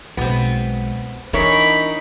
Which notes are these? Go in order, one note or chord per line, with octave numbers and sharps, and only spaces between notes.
B1 G#3 B3 C4
E3 D4 D#4 A#4 C#5 B5